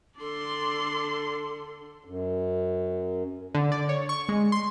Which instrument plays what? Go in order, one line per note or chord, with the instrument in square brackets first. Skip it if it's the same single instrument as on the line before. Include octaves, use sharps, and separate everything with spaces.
[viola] D3 D4 [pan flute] A4 [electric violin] D5 C6
[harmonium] F#2
[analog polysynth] D3
D5
C#5
C#6
G#3
C6